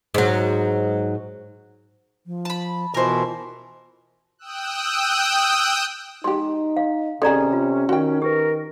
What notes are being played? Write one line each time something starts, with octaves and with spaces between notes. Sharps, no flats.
G#2 F#3
F3
A5 B5
B2 E3 F4 A#4 C5
G5 D#6 E6 F#6
G#3 D#4 G4 C6
F5
C3 D#3 C#4 G#4 A4 D5 A#5
F4
D#3 F#4 G5
G4 A#4 B4